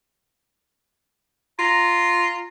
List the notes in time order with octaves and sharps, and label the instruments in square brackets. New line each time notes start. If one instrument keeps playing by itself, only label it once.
[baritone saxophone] F4 [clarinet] A#5